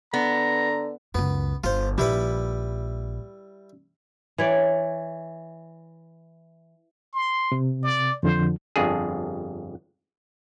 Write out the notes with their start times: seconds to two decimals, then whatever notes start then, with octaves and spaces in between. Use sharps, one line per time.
0.14 D3 B3 A#5
1.15 C#2 F#2 B3
1.64 G1 F4 C5
1.98 A#1 G3 E4 B4
4.38 E3 C#5 D5
7.13 C6
7.52 C3
7.83 D5
8.23 F2 D3 F3 C5
8.76 G1 F2 D4 G#4